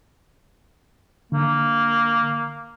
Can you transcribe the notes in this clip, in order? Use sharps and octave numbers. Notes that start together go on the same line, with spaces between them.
D3 A#3